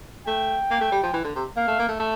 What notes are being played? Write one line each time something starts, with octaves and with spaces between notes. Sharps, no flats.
A3 G5
A#3
A3
G3
F3
E3
D3
C3
A#3 F5
A3
A#3
A3
A3